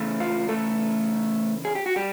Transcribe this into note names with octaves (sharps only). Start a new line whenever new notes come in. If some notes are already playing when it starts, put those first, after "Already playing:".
Already playing: C#3 E3 A3
F4
A3 A4
G#4
G4
F#4
G3 G4